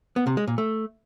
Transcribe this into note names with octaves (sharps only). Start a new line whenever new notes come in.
B3
C3
G#3
A#2
A3